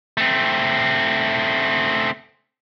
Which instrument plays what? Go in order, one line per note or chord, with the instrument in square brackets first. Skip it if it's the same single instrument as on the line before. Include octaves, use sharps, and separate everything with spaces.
[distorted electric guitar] A3 C4